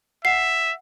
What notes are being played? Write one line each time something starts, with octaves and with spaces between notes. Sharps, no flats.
E5 F#5 C7